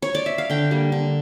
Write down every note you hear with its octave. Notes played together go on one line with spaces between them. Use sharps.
C#5
D5
E5
F5
D3 G5
G3 A#3
D3